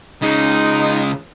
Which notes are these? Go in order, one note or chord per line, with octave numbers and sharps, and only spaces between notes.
C#3 G#3 D#4